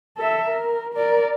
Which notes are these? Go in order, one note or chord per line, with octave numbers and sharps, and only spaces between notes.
A4 E5
A#4
A#4 D5